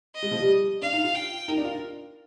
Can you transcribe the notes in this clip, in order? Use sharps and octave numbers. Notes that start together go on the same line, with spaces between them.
D#5
G#3
F3
G3
D4 F5
D#4
F4
G5
D#4 A#4
D4
F4